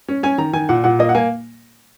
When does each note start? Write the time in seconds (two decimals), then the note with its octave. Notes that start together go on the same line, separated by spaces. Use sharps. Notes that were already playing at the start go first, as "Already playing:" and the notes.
0.08 C#4
0.23 C#4 G#5
0.38 D#3 A#5
0.53 D#3 G#5
0.69 A#2 F#5
0.84 A#2 F#5
0.99 A#3 D#5
1.09 F#5
1.15 A#3 G#5